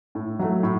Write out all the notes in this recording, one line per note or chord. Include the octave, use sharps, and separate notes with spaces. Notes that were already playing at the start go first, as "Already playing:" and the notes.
A2
F#3 A3
A2